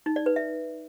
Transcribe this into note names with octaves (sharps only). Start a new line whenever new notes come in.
D#4
D5
B4
E5